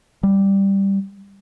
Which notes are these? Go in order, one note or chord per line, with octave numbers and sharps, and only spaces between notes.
G3